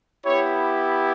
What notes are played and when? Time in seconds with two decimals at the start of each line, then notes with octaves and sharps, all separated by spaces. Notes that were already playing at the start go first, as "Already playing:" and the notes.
0.25 B3 E4 G4 C#5